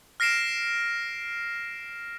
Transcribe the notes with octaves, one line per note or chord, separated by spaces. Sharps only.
F6 A#6 C7 D7 E7